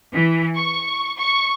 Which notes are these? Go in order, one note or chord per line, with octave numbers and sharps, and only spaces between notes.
E3
C#6
C#6